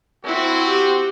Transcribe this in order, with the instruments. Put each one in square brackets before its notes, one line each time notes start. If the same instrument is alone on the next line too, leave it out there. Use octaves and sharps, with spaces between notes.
[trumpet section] C4 F#4 [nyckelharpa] E4
[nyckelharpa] G4